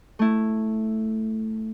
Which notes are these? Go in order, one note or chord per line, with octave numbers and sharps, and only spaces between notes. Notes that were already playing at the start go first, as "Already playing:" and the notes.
A3 E4